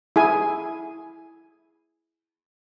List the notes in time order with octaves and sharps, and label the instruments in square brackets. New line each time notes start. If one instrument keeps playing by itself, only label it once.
[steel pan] E4 G#4 G#5